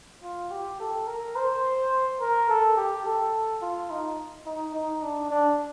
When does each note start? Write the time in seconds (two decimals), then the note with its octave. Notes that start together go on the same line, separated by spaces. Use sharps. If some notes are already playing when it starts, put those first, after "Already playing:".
0.23 F4
0.51 G4
0.80 A4
1.07 A#4
1.36 C5
2.20 A#4
2.49 A4
2.77 G4
3.06 A4
3.62 F4
3.91 D#4
4.46 D#4
4.75 D#4
5.02 D4
5.31 D4